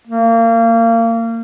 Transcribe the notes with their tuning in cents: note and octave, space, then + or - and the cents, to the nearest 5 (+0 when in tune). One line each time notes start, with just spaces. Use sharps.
A#3 -30